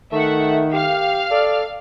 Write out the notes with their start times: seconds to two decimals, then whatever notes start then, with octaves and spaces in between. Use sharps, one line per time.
0.12 D#3 A3 E5 F#5
0.73 G4 F5 F6
1.31 A4 D5